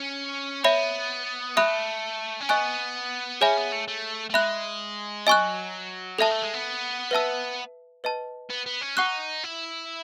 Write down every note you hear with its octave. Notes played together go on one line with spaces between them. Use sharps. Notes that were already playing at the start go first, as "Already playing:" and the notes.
Already playing: C#4
B3 C#5 E5 B5
A3 E5 B5 D#6 F#6
C#4
B3 D#5 G#5 C#6 F#6
C#4 G#4 C#5 E5 G#5 B5
B3
A3
A3
A3
G#3 E5 B5 F#6
F#3 D#5 G#5 C#6 F#6
G#3 A4 E5 A5
A3
G#3
B3
B4 E5 A5 E6
B4 D#5 A5
B3
B3
C#4
D#4 F#5 C#6 F#6
E4